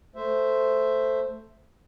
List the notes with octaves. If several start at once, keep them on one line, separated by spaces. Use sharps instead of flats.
A3 C5 E5